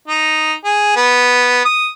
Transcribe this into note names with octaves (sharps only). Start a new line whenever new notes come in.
D#4
G#4
B3
D#6